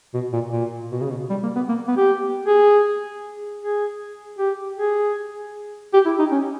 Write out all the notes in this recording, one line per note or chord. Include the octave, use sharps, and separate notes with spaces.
B2
A#2
A#2
B2
C#3
B2
G3
A#3
B3
A#3
B3
G4
G#4
G#4
G4
G#4
G4
E4
D#4
C#4